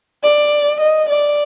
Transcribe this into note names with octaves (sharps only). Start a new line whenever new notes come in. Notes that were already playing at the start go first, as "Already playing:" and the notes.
D5
D#5
D5